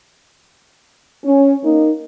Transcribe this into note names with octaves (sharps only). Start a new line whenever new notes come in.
C#4
A#3 D#4